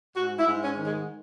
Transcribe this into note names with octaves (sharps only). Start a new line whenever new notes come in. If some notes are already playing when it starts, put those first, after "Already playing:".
G#2 F#4
E4
G#2
C#4
D#3
G#3